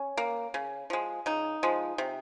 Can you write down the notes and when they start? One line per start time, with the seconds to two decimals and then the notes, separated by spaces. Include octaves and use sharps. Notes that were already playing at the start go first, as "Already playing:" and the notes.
Already playing: C#4
0.17 A#3
0.54 C#3
0.90 F3 G#3
1.26 C#3 D#4
1.63 F3 G#3
1.98 C3